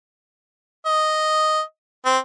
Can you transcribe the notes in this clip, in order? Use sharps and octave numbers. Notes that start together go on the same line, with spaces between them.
D#5
C4